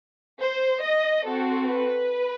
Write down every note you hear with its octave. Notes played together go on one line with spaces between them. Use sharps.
C5
D#5
C4 F#4 A4
B4